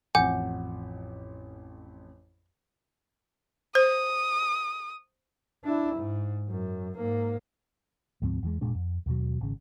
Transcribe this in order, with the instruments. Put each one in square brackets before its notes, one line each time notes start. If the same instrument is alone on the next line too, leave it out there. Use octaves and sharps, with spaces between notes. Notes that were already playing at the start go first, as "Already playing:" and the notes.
[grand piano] A1 F2 [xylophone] F#5 D6 G6 [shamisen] G#5
[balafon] C5 [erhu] D#6
[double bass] D4 E4
G#2
F#2
G#2 A#3
[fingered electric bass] D2 G#2 F3 C4
E2 E3 G#3
F1 A#2 G#3 D4
F2
D#2 B2 F#3
G#1 C#3